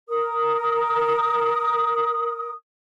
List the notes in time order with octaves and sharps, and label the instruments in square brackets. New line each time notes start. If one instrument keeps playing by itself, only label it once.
[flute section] A#4 D#6